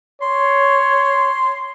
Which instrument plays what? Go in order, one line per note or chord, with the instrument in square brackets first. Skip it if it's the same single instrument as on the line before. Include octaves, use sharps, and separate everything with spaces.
[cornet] C#5 [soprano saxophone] C6